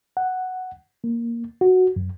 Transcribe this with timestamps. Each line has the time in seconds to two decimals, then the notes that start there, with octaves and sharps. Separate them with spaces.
0.17 F#5
1.04 A#3
1.61 F#4
1.96 F#2